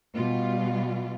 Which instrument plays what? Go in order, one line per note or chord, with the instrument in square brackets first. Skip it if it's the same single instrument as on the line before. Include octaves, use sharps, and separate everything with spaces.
[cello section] B2 G3 F4